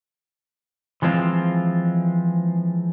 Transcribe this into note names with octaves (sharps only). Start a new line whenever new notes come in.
E3 F3 G#3 C4 F4